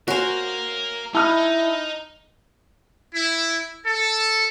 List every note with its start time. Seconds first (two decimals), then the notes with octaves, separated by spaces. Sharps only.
0.08 F#4 A#4 C5 C#5 F5 G#5
1.14 D#4 E4 A5 D#6 F6
3.15 E4
3.85 A4